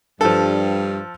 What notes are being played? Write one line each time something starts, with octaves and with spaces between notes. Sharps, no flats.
G2 F3 A4